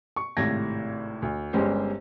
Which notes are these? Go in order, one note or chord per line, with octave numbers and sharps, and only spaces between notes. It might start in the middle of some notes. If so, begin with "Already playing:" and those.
C#6
G#1 A2 C3 G#6 A#6
D2
G1 G#3 C#4 G4 C5